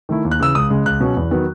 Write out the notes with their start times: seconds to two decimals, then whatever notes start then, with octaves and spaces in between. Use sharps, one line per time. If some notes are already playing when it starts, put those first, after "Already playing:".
0.09 D#3 A3 E4
0.25 D#2
0.31 F#6
0.40 C#3 E3 E6
0.55 C#2 D#6
0.70 C#3 G#3
0.86 C#2 F#6
1.00 B2 F#3 C#4
1.17 E2
1.31 D#3 F#3 B3